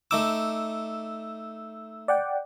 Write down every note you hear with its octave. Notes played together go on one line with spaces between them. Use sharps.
A3 D#4 D6 E6
D5 F#5 G5